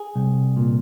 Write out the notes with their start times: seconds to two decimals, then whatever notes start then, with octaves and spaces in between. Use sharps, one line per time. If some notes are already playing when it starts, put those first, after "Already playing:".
Already playing: G#4
0.16 C2
0.57 A#2